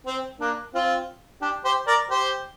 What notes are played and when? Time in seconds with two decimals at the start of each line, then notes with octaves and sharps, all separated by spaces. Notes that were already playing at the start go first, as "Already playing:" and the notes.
0.06 C4
0.40 A#3 D4
0.74 C4 F4
1.41 D4 G4
1.65 G4 C5
1.87 A#4 D5
2.10 G4 C5